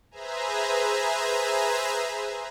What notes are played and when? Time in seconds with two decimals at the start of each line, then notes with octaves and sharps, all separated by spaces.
0.11 G#4 B4 C5 E5 G#5 A#5